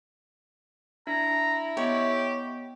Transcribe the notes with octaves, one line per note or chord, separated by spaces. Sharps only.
D4 E4 A#5
B3 G4 C#5 D#5 G5